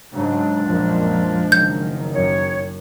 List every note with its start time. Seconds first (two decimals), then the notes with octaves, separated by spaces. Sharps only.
0.14 G#2 C#3 F#3 G#3 D4
0.66 A#1 F#2 A#2 F3
1.52 F#1 D#3 G6
2.14 F#2 C#5